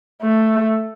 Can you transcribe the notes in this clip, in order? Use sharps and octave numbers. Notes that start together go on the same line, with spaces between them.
A3